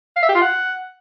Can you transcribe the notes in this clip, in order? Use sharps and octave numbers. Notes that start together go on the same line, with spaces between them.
F5
E5
G4
F4
F#5